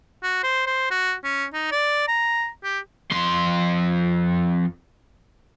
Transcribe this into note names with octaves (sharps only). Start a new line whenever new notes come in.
F#4
C5
C5
F#4
C#4
D#4
D5
A#5
G4
F2 C6